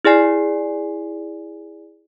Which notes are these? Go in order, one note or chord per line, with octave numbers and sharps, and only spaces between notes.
E4 G#4 D5 G#5 C7